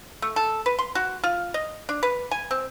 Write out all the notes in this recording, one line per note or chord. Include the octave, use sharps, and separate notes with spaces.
A3
A4
B4
C6
F#4
F4
D#5
D4
B4
G#5
C4